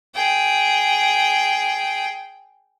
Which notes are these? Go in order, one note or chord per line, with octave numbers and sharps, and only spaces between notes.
G#4 G5